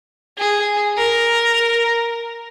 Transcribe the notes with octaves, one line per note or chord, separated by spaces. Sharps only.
G#4
A#4